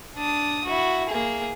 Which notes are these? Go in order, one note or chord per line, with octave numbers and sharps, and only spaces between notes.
D4 D#6
E4 F#4
A#3 G#4